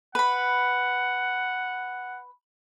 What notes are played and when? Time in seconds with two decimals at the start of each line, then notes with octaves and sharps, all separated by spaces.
0.15 B4 F#5 B5